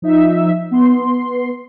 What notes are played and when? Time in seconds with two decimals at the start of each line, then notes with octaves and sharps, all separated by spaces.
0.02 F3 D#4 E5
0.71 B3 C6